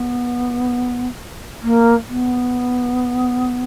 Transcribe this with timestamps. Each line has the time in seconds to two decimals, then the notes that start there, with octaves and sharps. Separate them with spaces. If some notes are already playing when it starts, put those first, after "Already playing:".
Already playing: B3
1.62 A#3
2.08 B3